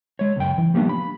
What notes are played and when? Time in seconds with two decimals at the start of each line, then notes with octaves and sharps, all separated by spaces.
0.19 G#3 C#5
0.36 C#2 F#2 G5
0.58 E3
0.74 F3 G3 A#3 B3 D4
0.89 B5